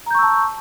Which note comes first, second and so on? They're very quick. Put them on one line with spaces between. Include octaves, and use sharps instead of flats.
A#5 G6 C#6 E6 A5